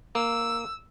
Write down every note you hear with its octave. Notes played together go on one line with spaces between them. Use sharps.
A#3 E6